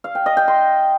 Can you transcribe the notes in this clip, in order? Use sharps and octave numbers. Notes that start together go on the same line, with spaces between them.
F5
G5
D#5
G5
C6